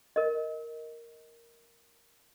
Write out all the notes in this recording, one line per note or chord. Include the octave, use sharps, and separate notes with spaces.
A#4 D#5